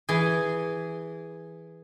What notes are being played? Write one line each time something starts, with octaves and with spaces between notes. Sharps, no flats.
E3 G#4